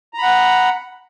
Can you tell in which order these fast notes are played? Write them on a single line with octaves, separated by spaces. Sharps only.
A#5 B5 F#5